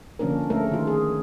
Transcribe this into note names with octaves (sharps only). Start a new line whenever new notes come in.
D3 F3 A#3 C#4 D4 A#4
G#3 A3 C#4 A4 A#4
D#3 F4
G#4